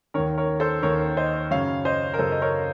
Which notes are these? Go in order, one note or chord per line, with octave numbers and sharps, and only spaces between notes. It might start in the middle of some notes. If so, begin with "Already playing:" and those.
D#2 D#3 A#4 C#5
A#4 C#5
A4 C5
D#2 D#3 A#4 C#5
C5 D#5
F#2 C#3 C#5 F5
C5 D#5
A#4
F#2 C#3 A4 C5
D#5
A#4 C#5